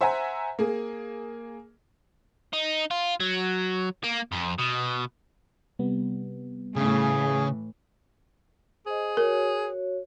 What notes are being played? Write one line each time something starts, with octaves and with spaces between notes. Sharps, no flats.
C5 E5 F#5 G#5 A#5
A#3 G#4
D#4
F4
F#3
A#3
F2
B2
C3 G3 B3
A2 C#3 E3 A3 G#4
G#4 C5 D#5
F#4 A#4 C#5